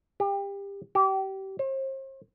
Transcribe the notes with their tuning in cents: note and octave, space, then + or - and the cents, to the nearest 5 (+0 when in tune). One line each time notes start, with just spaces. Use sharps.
G4 +25
G4 -30
C5 +40